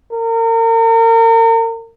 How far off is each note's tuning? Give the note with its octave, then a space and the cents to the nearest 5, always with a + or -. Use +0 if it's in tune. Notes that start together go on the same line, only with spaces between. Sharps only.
A#4 -35